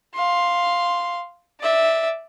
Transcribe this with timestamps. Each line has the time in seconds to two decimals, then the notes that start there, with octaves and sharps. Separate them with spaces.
0.15 F5 C6
1.61 D5 E5